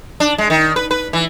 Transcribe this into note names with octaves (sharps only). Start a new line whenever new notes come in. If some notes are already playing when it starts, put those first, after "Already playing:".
D4
G#3
D#3
B4
B4
E3